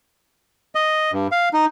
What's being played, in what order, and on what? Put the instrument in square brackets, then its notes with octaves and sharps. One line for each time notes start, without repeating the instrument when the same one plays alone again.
[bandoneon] D#5
G2
F5
D#4